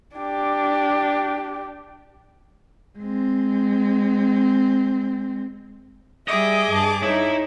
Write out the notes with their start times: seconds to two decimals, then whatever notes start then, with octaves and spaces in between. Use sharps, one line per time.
0.15 D4 G4
2.99 G#3 C4
6.28 G3 G#4 D#5 E5 D6
6.70 G2 A5
7.03 D#4 E4 C#5